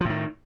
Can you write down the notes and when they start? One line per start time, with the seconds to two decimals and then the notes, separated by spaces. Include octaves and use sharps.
0.01 F3
0.05 A2
0.10 D#3